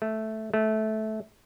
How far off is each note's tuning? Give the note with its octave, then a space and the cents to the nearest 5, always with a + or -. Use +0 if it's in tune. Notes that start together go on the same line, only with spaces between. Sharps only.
A3 -5
A3 -15